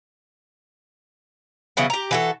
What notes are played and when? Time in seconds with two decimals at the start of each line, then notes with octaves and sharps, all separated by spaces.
1.77 C#3 E3 F#3 B3
1.90 G4 A#5
2.11 E3 F#4 A4